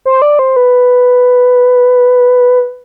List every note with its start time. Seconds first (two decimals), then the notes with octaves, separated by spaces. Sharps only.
0.05 C5
0.22 D5
0.39 C5
0.56 B4